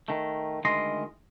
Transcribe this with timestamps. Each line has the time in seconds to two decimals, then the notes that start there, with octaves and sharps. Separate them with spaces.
0.08 D#3 A3
0.65 D2 D#3 G#3 E4 D#5 C6